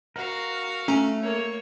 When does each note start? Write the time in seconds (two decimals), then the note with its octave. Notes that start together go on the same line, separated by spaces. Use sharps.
0.16 F#4 A#4 F5
0.88 A3 C#4 A#5
1.22 A#3 C#5